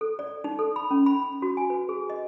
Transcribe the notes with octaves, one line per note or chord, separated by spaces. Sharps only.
A4
D5
D#4
A4
B5
C#4
B5
F#4
G#5
B4
G#4
D#5